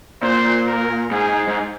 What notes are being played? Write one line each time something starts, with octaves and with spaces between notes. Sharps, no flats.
A#2 C5
A#4
G#2 G#4
G#2